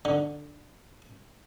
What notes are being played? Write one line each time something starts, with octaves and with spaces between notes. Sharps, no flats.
D3